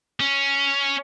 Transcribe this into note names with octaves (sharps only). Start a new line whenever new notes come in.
C#4